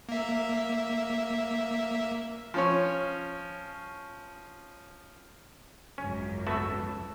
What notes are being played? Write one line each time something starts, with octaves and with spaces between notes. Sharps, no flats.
A#3 E5
F3 C#4 C#5
G#1 C#2 F#2 C#4
A3 B3 F#4 A5 C#6 E6